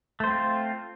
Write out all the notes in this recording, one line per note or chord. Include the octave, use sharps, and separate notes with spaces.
A3 C4 F4 C5